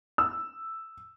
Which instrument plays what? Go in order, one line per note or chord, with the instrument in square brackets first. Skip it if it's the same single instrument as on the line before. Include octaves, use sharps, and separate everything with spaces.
[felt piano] E6